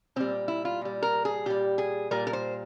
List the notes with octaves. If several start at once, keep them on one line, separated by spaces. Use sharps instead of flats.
A#2 G3 C4
E4
F4
A#2 G3
A#4
G#4
A#2 G3 G4
G#4
A#2 G3 A#4
A#4
C5